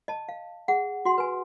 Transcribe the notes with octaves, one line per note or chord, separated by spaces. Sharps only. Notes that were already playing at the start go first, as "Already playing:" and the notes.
D#5 A5
F5
G#4 F#5
F#4 F#5 C6
B4 G#5